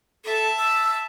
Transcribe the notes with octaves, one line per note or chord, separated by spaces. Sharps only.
A4 E5 A5
E6